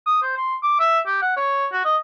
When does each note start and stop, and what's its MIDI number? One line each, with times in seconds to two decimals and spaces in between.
0.06 0.22 87
0.23 0.36 72
0.37 0.55 84
0.63 0.77 86
0.80 0.99 76
1.07 1.21 67
1.22 1.34 78
1.37 1.66 73
1.72 1.84 66
1.85 1.97 75